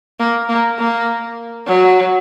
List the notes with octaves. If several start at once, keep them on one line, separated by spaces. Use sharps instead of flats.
A#3
A#3
A#3
F#3